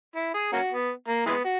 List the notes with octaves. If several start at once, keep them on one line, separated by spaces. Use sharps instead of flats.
E4
G#4
A#3 C#4 F#4
B3
A#3
E3 G#3 B3
F#4